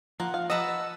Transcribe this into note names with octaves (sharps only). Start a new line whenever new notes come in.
F3 A#3 F4 F#5
F5
B4 D#5 F#5 A5 A#5 E6